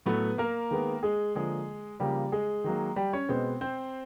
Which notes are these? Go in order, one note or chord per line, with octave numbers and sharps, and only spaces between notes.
A2 F#3 A3 B3 B4
A#3 A#4
D#3 G#3 B3
G#3 G#4
D3 F3 G#3 A#3 G#4
C#3 F3 G3 A#3 G4
G#3 G#4
D#3 F#3 A#3
G3 G4
C#4 C#5
B2 G#3 B3 C4 C5
C4 C5